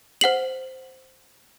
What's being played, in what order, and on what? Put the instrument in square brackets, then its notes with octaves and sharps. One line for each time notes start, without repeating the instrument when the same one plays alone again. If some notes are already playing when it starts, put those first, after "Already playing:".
[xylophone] C5 F#5 C7 F#7